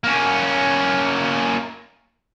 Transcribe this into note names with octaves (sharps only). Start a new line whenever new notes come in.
A#3 C#4